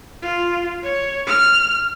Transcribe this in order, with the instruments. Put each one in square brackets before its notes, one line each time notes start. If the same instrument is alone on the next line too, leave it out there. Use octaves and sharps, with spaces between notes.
[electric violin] F4
C#5
F6